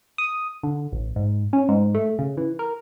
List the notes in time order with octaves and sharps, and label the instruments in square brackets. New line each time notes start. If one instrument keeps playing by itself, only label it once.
[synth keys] D#6
D3
A1
G#2
C#4
G#2
A3
C#3
E3
A#4